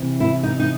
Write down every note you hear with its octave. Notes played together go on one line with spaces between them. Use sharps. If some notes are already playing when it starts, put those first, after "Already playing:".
Already playing: C3 E3
E4
D#4
D#4